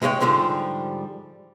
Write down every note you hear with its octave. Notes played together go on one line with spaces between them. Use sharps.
G#2 G#3 E4 F#4 C#5 G5
G#2 D3 F3 G3